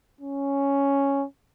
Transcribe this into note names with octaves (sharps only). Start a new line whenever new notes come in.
C#4